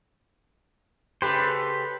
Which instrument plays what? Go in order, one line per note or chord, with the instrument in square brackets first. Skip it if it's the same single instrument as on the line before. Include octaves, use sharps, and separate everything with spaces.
[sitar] C#3 A3 G4 [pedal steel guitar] B4 C5